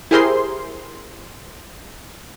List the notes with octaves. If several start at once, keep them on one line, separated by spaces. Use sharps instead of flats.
E4 G4 G#4 A#4 C5 C6